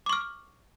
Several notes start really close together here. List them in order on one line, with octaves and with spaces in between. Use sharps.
D6 C#6 F6